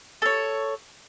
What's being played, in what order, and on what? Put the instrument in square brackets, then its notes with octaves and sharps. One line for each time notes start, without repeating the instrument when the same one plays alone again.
[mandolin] A4 C#5